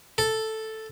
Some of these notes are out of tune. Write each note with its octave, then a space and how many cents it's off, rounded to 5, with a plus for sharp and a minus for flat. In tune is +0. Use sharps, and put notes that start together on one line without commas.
A4 +0